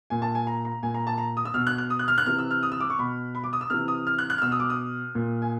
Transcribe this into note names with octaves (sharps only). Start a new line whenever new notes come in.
A#2 G#5
A5
G#5
A#5
A#5
A#2 G#5
A#5
A5
A#5
D#6
E6
B2 F6
F#6
F#6
D#6
F#6
F6
F#6
C3 E3 F6
E6
F6
D#6
E6
D6
C#6
B2 B5
B5
D6
D#6
E6
C3 E3 F6
D#6
F6
F#6
F#6
F6
B2 E6
D#6
D6
D#6
A#2
G#5